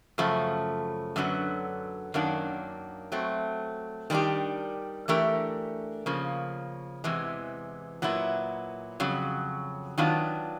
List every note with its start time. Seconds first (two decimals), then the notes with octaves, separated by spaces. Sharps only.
0.18 F#2 C#3 F3 A3
1.16 F#2 D3 F#3 B3
2.14 F#2 D#3 F#3 A#3 D4
3.12 F#3 A3 C4
4.10 D#3 G3 A#3 D4 G4
5.08 E3 A3 D4 G4 A#4
6.06 C#3 F3 A#3
7.04 E2 C3 E3 G#3
8.02 A#2 F#3 B3 E4
9.00 F2 C#3 F#3
9.98 D#3 F#3 B3 D4 F4